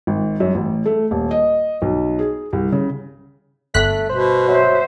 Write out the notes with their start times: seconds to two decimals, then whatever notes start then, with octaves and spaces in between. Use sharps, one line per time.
0.07 G#1
0.40 F#2
0.55 A1
0.86 A3
1.11 D#1
1.31 D#5
1.82 B1
2.19 G#4
2.53 C2
2.72 C#3
3.74 G1 A3 F#6 B6
4.09 B2 C5
4.48 F#3 C5 E5